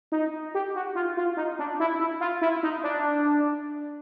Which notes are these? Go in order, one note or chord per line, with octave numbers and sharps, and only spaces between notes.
D#4
G4
F#4
F4
F4
D#4
D4
E4
E4
F4
E4
D#4
D4